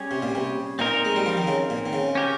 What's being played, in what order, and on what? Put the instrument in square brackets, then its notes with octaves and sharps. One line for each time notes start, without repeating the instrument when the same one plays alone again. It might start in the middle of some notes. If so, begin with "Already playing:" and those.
Already playing: [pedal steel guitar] G3 C#4 G#4 C#5
[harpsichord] C3
A#2
C3
[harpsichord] A#2 [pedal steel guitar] C4 D#4 A#4
[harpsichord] G#3
G3
F3
D#3
C#3
A#2
D#3
C#3
[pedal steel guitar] C#4 G4 A#4